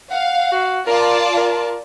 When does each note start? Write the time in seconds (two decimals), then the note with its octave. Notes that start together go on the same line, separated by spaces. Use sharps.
0.11 F5 F#5
0.52 F#4
0.87 F4 A#4 D5 A5
1.37 A#4